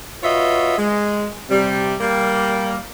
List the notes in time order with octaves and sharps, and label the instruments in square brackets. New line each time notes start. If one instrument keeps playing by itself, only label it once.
[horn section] F4 F#4 B4 C#5 D#5 E5
G#3
C3 G3
G3 A#3